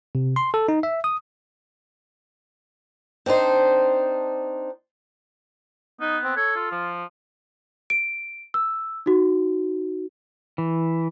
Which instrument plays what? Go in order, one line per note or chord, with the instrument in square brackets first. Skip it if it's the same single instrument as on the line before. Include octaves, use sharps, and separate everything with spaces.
[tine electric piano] C3
C6
A4
D#4
E5
D#6
[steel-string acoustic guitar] C4 D4 D#4 C5
[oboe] B3 [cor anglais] D#4
[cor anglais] C4
[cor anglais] A4 [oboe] C#5
[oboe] F4
[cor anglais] F3
[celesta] D7
E6
D#4 F#4
[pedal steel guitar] E3